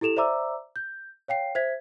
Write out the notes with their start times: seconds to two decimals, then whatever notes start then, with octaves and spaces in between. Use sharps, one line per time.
0.01 E4 G4 A4 E7 F7
0.17 C5 D5 E5 A#5 D6 E6
0.76 G6
1.28 C#5 F5 G5 C7
1.55 C5 E5 G#6 B6